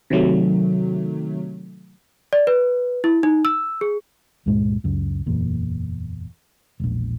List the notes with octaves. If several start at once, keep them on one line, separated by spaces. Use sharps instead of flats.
C3 D#3 F#3 A3
D5
B4
E4
D#4
E6
G#4
C#2 G2 A#2 G#3
C#2 F#2
F#1 E2 A#2
E1 A#1